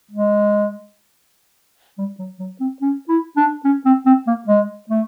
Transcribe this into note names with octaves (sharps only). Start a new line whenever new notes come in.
G#3
G3
F#3
F#3
C4
C#4
E4
D4
C#4
C4
C4
A#3
G#3
A3